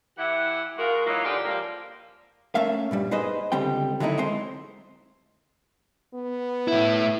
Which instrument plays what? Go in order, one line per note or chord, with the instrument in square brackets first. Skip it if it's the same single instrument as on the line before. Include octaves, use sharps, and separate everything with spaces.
[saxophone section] E3 E4 G4 F#5
G#3 F4 F#4 A#4
E3 F#3 A#3 D#4 F4
G#2 D3 F4 G4 D5
F3 G3 A#3
[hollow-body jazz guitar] A3 A#3 C#4 E5 F5
G2 A#2 G3
D#4 G#4 B4 C5 D#5
C#2 D3 G3 C4 G5
D3 F#3 A3 D#4 E4
G#3 C4 C5 C6
[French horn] B3
[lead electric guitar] A2 E4